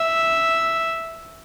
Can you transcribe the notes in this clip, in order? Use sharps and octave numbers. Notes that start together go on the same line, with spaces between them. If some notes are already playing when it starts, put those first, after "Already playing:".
Already playing: E5